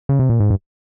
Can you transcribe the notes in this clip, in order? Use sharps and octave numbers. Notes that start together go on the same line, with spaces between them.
C#3
C3
A#2
G#2
G2